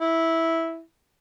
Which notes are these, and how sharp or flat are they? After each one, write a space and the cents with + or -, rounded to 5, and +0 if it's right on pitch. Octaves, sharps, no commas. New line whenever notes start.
E4 -10